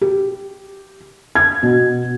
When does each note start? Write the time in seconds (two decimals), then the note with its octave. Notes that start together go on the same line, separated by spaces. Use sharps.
0.01 G4
1.35 G#6
1.63 B2